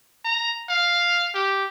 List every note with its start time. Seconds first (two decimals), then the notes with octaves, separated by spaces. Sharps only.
0.25 A#5
0.69 F5
1.35 G4